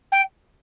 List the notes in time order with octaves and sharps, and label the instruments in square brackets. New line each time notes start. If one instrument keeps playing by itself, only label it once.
[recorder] G5